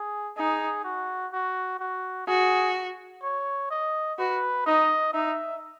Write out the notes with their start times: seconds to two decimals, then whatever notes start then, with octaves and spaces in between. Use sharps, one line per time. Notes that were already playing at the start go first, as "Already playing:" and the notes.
Already playing: G#4
0.37 D#4 G#4
0.84 F#4
1.33 F#4
1.80 F#4
2.27 F#4 G#4
3.23 C#5
3.71 D#5
4.19 F#4 B4
4.66 D#4 D#5
5.13 D#4 E5